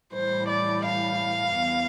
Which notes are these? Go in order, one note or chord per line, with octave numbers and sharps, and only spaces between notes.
A2 E3 G3 C5
D5
F5
E2